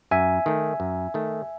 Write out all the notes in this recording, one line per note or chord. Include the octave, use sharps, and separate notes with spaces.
F#2 E5 G#5
D#3 A3
F#2
D#3 A3